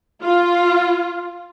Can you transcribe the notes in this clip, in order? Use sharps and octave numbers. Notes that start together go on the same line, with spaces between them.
F4